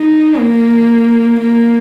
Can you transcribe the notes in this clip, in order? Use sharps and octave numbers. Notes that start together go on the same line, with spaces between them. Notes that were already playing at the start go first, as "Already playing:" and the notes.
Already playing: D#4
A#3
A#3